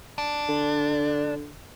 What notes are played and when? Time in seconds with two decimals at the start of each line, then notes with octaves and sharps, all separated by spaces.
0.18 D4
0.49 D3